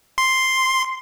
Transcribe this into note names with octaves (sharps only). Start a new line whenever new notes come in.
C6